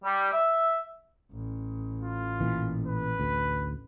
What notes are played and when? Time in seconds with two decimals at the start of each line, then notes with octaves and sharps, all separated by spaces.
0.04 G3
0.32 E5
1.32 A1
2.00 F4
2.40 A#2 E3
2.86 B4
3.20 D2